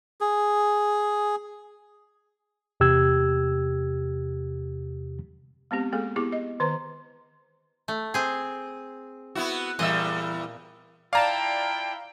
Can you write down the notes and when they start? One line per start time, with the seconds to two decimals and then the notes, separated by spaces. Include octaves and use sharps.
0.21 G#4
2.80 E2 C3 G4 E6 G#6
5.71 G#3 B3 C4 G4
5.92 G#3 A#3 G#4 A4
6.16 B3 E4 G4 G#4 D6
6.32 D#5
6.60 D#3 B4 C5 A#5
7.88 A3
8.14 C4 G#4
9.35 B3 E4 F#4
9.79 E2 A#2 G3 D#5 E5
11.13 E4 F4 D5 F5 G5 A5 A#5